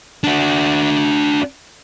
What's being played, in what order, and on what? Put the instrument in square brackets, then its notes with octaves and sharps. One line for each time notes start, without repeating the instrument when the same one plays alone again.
[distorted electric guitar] D4 F#4